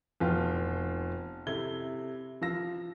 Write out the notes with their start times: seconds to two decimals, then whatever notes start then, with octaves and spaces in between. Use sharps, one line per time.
0.20 F1 B2 F3 F4 G5
1.47 C3 E4 A4 G#6 G7
2.41 F3 F5 E6 A#6